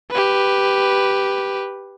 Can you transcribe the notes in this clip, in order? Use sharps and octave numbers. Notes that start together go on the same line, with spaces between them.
G4 B4